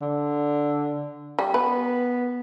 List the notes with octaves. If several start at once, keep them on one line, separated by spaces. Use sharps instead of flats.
D3
G3
B3 B4